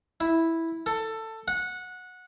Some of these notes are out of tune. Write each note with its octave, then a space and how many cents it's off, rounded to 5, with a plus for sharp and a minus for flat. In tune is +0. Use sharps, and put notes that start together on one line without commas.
E4 -5
A4 +15
F#5 -15